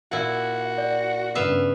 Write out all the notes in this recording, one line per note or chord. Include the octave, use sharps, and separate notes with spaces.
A#2 E4 F#4 F5
D5
G2 C#3 B3 E5 F5